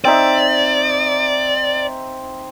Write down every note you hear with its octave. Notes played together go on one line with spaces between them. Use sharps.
C4 D#4 D5 E5